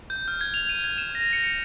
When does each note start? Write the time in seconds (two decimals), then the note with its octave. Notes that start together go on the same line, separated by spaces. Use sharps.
0.10 G6
0.28 F6
0.41 G#6
0.54 F7
0.69 D#7
0.84 G#6
0.98 E7
1.15 A#6
1.33 C#7
1.47 C#7